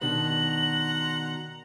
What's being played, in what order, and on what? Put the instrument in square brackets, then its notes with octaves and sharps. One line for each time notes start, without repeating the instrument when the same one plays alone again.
[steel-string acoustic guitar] B2 D#3 D4 [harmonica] F#5 A#5 C6 [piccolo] F#7